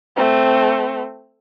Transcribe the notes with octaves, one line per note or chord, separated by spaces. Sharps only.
A3 C4